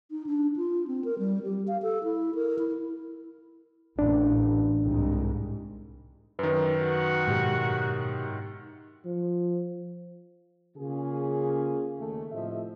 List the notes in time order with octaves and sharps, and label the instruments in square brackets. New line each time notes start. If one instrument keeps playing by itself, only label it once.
[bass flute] D#4
D4
F4
C4
A#4
G3
G4
F5
A4
E4
A#4
E4
[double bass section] A1 [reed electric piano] D4
[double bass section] C2 G#2
[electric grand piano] F#2 D#3 [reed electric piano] B4
[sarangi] F#4
[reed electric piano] G#2 B2 G4
[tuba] F3
[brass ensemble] C#3 A#3 C#4 F4 G#4
D#2 A3
A2 C3 F3 D#5 E5